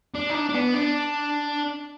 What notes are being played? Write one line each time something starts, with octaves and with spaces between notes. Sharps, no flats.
D4
D#4
D4
D4
B3
D4